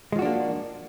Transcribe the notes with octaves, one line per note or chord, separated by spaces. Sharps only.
F3 G#3 A#3 D4 F#4